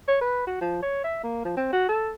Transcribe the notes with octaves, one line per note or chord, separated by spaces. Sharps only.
C#5
B4
F#4
F3
C#5
E5
A#3
F3
C4
F#4
A4